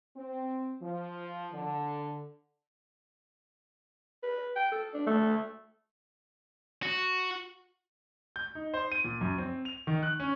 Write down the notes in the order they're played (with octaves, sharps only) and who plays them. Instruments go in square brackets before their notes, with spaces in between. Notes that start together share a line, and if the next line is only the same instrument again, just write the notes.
[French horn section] C4
F3
D3
[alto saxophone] B4
G5
A4
D4
A3
[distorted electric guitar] F#4
[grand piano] G6
D#4
C5
D#7
A#2
F#2
C4
F7
D#3
F#6
C#4